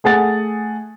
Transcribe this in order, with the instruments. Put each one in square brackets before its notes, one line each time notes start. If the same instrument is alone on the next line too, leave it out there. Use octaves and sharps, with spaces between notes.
[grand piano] A3 G#4 F#5 A6